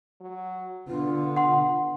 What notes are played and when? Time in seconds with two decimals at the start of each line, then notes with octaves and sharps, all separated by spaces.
0.21 F#3
0.88 D3 B3 F4
1.36 F#5 C6